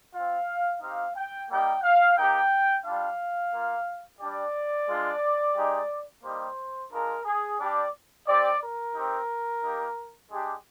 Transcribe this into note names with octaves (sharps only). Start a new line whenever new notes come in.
C4 F4 F5
C4 D#4 G4 F5
G5
G3 A#3 D#4 G4 G5
F5
A#3 D#4 G4 G5
G3 D4 F4 F5
A#3 F4
G3 D4 G4 D5
G#3 D4 F4
G#3 D#4 G4
G3 A#3 D#4 G4 C5
G#3 D4 F4 A#4
G#4
G3 D4 G4 D5
C4 G4 D5
A#4
C4 D#4 G4
A#3 D#4 G4
G#3 D4 G4